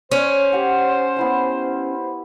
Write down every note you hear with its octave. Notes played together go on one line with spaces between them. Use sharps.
C#4 C5 C#5
G4 F#5 G#5
B3 E4 E5